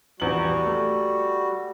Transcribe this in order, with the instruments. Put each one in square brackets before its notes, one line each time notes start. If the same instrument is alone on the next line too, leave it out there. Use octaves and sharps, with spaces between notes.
[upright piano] A#1 E2 F#7 [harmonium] G3 F#4
[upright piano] A3